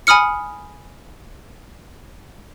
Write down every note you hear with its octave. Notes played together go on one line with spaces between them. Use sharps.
G#5 B5 D#6 F6 C#7